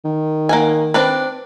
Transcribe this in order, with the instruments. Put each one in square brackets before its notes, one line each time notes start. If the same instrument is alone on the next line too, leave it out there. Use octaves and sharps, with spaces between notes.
[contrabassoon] D#3
[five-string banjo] A#3 F#5 G#5
C4 D4 B4